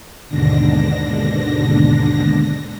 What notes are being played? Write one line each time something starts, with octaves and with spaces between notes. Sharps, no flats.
D#2 G#2 B2 D3 D4 A#6